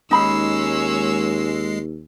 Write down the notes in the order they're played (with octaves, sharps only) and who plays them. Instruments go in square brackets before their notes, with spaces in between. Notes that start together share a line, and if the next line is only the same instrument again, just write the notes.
[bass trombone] D#2 [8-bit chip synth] G#3 C7 [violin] C#4 E6 [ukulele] D#4 B5